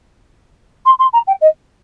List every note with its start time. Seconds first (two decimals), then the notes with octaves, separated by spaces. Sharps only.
0.85 C6
0.99 C6
1.13 A#5
1.27 G5
1.41 D#5